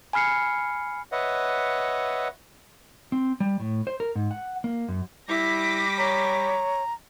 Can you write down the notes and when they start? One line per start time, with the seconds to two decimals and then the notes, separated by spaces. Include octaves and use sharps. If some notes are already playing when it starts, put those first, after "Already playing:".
0.13 G#5 B5 F6 C7 C#7
1.12 B4 C#5 D#5 E5 F#5
3.12 C4
3.40 G3
3.60 A2
3.87 C5
4.00 A#4
4.15 G#2
4.31 F#5
4.64 A#3
4.88 F#2
5.29 G3 E4 D6 A#6 B6
5.98 C#5 A#5